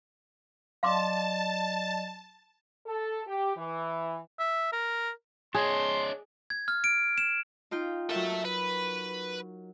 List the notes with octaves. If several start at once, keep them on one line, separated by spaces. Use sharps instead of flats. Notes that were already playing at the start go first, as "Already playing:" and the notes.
F#3 D5 D#5 F5 A5 C6 D6
A4
G4
E3
E5
A#4
D4 G#4 C#5 D#5 C6
G#6
F6
D7
E7
D#4 F4 G5
F#3 A4 A#4 E5
B4